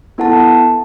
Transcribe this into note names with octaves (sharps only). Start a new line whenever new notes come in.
B3 E4 A4 F#5 A5